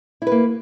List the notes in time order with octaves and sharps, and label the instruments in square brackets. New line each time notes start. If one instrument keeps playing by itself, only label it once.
[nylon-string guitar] E4
B4
A#3